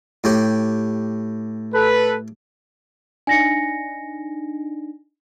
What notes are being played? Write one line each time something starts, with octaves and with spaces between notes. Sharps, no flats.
A2 G4
A4 B4
D4 D#4 G#5 A#6 C#7